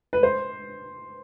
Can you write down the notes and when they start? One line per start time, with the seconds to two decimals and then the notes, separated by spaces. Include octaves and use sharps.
0.13 B4
0.23 C5